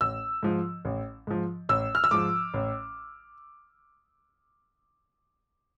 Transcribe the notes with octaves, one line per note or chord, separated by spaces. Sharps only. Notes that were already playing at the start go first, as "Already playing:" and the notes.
A1 E6
G#2 F3
A1
G#2 F3
A1 E6
F6
E6
G#2 F3 D6
A1